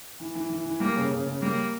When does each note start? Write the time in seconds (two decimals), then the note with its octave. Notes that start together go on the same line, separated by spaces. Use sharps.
0.20 E3
0.35 E3
0.49 E3
0.65 E3
0.80 G3 A#3
0.96 C#3
1.11 C#3
1.26 C#3
1.42 G3 A#3